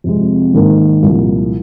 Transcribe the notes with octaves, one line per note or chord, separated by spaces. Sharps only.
F2 C3 G#3
G#2 D#3 A#3 D#4 A#4
C2 A#2 F3 A#3